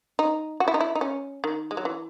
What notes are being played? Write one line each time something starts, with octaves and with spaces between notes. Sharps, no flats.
D#4
F#4
E4
D#4
E4
D#4
C#4
D#3
G#3
F#3
E3